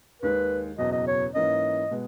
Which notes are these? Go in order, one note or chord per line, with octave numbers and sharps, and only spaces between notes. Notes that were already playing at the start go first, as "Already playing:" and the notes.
D#2 D#3 G#3 B4
F#1 E2 B2 F#3 D#5
D#5
C#5
G#2 E3 A#3 C#4 D#5
B2 G#3 B3